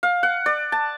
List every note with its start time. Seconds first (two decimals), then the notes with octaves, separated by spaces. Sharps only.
0.03 F5
0.23 F#5
0.46 D5
0.72 A5